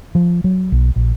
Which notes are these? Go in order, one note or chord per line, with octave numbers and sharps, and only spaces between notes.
F3
F#3
B1
A#1